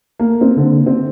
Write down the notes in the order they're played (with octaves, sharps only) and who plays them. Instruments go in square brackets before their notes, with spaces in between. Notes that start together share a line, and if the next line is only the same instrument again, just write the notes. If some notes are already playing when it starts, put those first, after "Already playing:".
[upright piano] A#3
C4
D3
C4